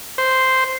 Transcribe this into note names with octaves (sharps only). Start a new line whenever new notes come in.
C5